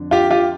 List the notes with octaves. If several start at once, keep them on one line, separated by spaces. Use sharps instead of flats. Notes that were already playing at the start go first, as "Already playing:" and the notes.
Already playing: F2 D3
F4 G4
F4 G4